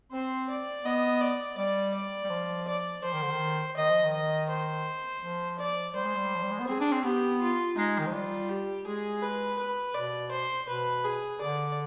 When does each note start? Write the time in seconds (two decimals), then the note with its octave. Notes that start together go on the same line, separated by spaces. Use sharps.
0.12 C4 C5
0.49 D5
0.85 B3 D#5
1.21 D5
1.57 G3 D5
1.94 D5
2.24 G3
2.30 F3
2.67 D5
3.03 F3 C5
3.13 D#3
3.22 D3
3.30 D#3
3.76 D#3 D#5
3.90 F3
4.04 D#3
4.13 D#5
4.50 C5
5.22 F3
5.59 D5
5.95 G3 C5
6.05 G#3
6.16 G3
6.35 F3
6.43 G3
6.51 G#3
6.59 B3
6.67 C4 G#4
6.80 D4
6.92 C4
7.04 B3 G4
7.41 F4
7.77 G#3 D#4
7.99 D#3
8.07 F3
8.13 G3 F4
8.49 G4
8.86 G#3 G#4
9.23 B4
9.59 B4
9.95 B2 D5
10.32 C5
10.68 B2 B4
11.05 G#4
11.41 D3 D5